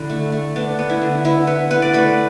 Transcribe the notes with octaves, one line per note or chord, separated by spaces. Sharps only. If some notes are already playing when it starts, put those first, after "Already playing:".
Already playing: D3 E4
A3
A3
B3 D4
B3
E4
D3
B3 E4
B3 B4
B3 B4
D5
A3 B4